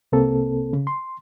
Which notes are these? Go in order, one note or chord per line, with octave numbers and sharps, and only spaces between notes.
C2 C3 A#3 C4 A4
C#3
C6